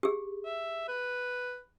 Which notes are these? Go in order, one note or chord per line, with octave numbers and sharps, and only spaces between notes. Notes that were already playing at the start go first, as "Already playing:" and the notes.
G4 G#4
E5
B4